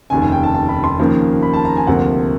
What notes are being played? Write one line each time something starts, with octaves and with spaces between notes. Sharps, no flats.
F1 D#2 C#3 G#5
G#5
G5
A5
A5
B5
C6
D#2 C#3 F3 A#3
B5
A5
A#5
G#5
D2 C3 F3 A#3 F#5